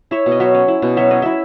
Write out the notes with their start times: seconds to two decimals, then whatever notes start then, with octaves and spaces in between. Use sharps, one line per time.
0.11 E4 C#5 E5
0.26 B2
0.32 D#5
0.40 F#3 C#5 E5
0.55 C#4
0.68 E4
0.82 B2
0.97 F#3 C#5 E5
1.11 C#4 D#5
1.22 E4 E5